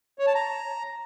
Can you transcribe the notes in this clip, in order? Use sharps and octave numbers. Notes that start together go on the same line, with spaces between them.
C#5
A5
A#5